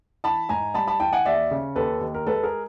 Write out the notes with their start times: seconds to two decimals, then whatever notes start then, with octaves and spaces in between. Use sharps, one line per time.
0.24 E3 A5 B5
0.49 G#2 G#5 A#5
0.74 G3 A5 B5
0.87 A5 B5
1.00 E3 G5 A5
1.13 F#5 G#5
1.25 D#2 D5 E5
1.51 C#3
1.76 D#2 A4 B4
2.01 D#2
2.14 A#4
2.27 G#3 A4 B4
2.43 G#4 A#4